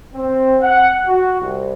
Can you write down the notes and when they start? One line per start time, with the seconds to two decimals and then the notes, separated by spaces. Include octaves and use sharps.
0.14 C4
0.61 F#5
1.07 F#4
1.40 C2